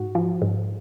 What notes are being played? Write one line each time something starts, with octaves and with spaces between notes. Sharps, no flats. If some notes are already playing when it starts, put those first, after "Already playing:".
Already playing: G#2 F#4
F3
G#2